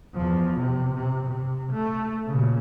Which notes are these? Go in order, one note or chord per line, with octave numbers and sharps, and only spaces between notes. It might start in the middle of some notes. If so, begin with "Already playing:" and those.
E2 F3
C3
C3
C3
A3
A#2 C#3